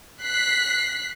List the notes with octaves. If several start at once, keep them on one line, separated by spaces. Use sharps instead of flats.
F#6 B6 C7